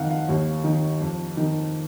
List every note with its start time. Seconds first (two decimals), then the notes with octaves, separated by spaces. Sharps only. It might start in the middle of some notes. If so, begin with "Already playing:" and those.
Already playing: F2 D#3 F5 F#5
0.10 F5
0.29 D#2
0.64 D#3
1.01 F2
1.37 D#3